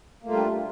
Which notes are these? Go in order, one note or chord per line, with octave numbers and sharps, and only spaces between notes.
G3 A3 A#3 D4 F4